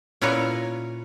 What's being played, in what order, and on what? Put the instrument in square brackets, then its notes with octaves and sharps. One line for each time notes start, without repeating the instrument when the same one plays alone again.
[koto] A#2 C#4 E4 A#4 B4 C#5